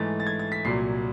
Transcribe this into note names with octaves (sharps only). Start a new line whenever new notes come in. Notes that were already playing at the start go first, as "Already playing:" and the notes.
Already playing: G#2 E3 A3 A6
A6
G#6
A6
B6
C2 A#2 F#3 C7